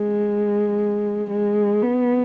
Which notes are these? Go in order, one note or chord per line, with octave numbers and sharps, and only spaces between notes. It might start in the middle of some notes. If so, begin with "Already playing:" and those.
Already playing: G#3
G#3
B3